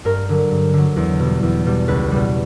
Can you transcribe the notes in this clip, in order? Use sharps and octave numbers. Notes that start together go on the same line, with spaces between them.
G2 A#4
D3 F#3
G2
D3 F#3
E2
B2 G3
E2
B2 G3
C#2 B4
B2 G3